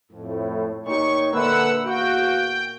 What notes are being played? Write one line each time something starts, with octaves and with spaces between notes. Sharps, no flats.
F2 A2
A#2 D#4 G4 C#5 C#6
D3 A#3 B4 E5 F#5 E6
E2 F#4 F5 G5